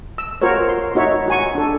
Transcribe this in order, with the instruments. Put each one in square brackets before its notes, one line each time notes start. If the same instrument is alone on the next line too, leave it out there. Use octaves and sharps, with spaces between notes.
[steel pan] E6
F4 F#4 A#4 C5 C#5
C6
D#4 F#4 C#5 E5
F#4 G#5 C#6
D4 A4